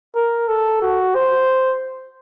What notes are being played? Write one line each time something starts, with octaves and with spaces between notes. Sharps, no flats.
A#4
A4
F#4
C5